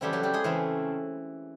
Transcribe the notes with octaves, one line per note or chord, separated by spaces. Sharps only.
C#3 E3 G3 A3 C4 E4 G4
F#3 F#4
G3 G4
G#3 G#4
C#3 E3 A3 C4 E4